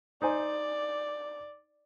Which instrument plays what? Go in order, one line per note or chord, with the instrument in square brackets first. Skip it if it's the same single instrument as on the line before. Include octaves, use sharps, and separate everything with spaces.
[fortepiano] D#4 C5 G#5 [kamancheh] D5